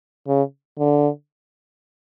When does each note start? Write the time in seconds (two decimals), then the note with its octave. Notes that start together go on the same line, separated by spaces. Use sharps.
0.27 C#3
0.78 D3